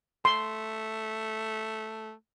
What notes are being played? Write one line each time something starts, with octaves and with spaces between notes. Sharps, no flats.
A3 C6